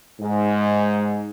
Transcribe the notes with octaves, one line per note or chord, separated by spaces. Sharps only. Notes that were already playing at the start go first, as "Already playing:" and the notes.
G#2